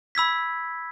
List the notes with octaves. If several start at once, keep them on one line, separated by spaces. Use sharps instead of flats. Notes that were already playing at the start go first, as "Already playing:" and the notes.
B5 E6 G#6 B6